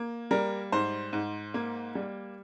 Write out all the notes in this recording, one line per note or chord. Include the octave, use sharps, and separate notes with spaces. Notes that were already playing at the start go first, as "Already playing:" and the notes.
Already playing: A#3
G3 A#4
G#2 C5
G#2
A#3
G3